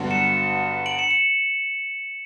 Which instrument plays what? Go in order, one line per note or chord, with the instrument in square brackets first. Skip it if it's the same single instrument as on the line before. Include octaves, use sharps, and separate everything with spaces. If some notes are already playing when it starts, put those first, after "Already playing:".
Already playing: [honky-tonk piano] G2 D3 F#3 B3 F#4
[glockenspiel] C#7 E7
D7 F#7
C#7 E7
C#7 E7